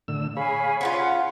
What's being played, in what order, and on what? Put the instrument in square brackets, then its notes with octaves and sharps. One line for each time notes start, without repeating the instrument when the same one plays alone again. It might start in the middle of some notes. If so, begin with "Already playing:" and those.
[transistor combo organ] A2 D3 E6
[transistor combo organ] G#4 C#5 B5 [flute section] F5 G#5
[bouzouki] C#4 E4 F4 [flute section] F#5